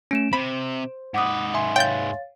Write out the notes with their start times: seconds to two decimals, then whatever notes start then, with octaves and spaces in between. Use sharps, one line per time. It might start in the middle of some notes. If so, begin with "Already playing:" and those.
0.11 A3 C#4 D7 E7
0.33 C3 C5 B5
1.14 G#2 B4 F#5 D6 D#6
1.54 E5 G#5 C6
1.76 C#5 F5 G5 G6 A6